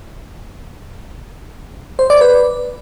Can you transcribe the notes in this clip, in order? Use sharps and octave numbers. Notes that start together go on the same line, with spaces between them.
C5
D5
B4